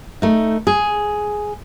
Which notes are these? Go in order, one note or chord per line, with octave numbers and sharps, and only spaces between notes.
A3 D#4
G#4